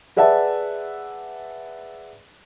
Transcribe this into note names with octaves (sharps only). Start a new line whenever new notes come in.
G#4 B4 D5 E5 F#5 A5